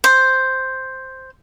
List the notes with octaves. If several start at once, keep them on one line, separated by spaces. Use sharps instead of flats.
C5